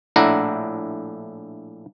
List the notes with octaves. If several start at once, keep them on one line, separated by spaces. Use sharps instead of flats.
A#1 A2 D4 E4 F#5 A#5